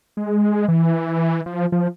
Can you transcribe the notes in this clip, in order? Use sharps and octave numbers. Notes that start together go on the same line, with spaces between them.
G#3
E3
F3
F3